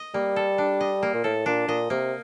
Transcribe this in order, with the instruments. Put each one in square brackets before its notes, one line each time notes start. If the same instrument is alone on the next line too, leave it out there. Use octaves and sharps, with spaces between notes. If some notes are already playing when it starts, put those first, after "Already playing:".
Already playing: [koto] D#5
[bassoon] G3 [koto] A#3
[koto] A4
D4
D#5
A#3
[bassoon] A#2
[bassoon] A2 [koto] A4
[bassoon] A#2 [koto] D4
[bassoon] A#2 [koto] D#5
[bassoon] C3 [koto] A#3